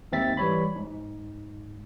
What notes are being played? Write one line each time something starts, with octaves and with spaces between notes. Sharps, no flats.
D#2 G#2 C4 E5 A6 B6
E3 G3 C#5 B5
G#2